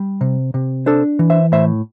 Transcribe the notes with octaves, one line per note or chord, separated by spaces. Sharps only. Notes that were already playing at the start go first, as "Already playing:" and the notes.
Already playing: G3
C3
C3
D4 A4 C5
E3
C5 E5
A2 C5 E5